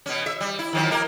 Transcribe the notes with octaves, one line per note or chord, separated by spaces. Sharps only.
B2 C#4
E5
G3
E4
D#3 F3 F#3
A#3 A#4